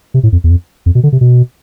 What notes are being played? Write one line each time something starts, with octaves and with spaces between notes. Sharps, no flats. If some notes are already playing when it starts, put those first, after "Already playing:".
C3
A2
F2
E2
F2
F2
B2
D3
C3
B2